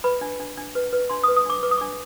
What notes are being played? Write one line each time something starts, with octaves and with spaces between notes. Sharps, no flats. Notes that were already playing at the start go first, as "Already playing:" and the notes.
B4 B5
D4
D4
D4
B4
B4
D4 C6
D#6
B4
D#6
D4 D6
B4 D6
D#6
D4 D6